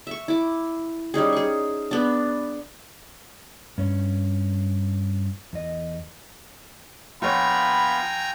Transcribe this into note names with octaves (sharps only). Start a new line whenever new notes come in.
E5 C#6
E4 D6
G3 C#4 D#4 G#4
G#4 C#6
B3 D4
G2 C#4
E2 D#5
A#1 B3 F4 C#5 G5 G#5 A#5 B5